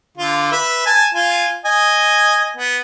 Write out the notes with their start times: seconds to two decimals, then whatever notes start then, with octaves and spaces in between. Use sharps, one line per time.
0.18 D3 F4
0.52 B4 E5
0.86 G#5 A5
1.15 F4 G#5
1.65 D#5 G#5
2.57 B3